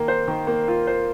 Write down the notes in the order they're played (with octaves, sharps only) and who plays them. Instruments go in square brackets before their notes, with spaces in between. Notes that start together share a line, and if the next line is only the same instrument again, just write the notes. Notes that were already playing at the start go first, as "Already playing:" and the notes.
Already playing: [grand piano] D#3 A#3
C5
D#3
A#3
F4
C5